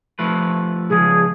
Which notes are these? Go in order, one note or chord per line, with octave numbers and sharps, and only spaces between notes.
F3 A3 B4
C#2 F3 G#4